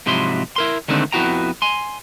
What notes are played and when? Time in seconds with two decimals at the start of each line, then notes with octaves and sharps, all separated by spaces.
0.06 G#2 C3 F3 F#3 E4 C6
0.56 E4 A#4 C6
0.88 D3 D#3 G#3 A3 C4 D4
1.12 F2 B3 E4 F#4 G5 A#5
1.62 G#5 C6